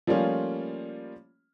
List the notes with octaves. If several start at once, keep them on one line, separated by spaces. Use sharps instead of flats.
F3 G3 A3 A#3 C#4 F4